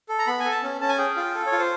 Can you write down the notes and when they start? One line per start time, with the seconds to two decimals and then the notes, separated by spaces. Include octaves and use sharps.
0.09 A4
0.19 A#5
0.27 B3 B5
0.40 G#5
0.45 A4
0.51 A5
0.63 C#4
0.81 C#4 A5
0.89 G#5
0.98 G#4 G5
1.17 F4
1.35 A4
1.46 C#5
1.52 F4
1.58 C5